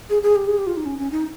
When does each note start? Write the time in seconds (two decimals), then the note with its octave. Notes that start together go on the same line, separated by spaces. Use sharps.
0.10 G#4
0.23 G#4
0.36 G4
0.48 G#4
0.58 G4
0.67 F4
0.77 D#4
0.86 C#4
0.99 C#4
1.11 D#4